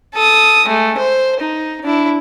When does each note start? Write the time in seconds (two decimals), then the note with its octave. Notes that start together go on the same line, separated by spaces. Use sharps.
0.14 A4 D#6
0.66 G#3 A3
0.98 C5
1.40 D#4
1.84 D4 E4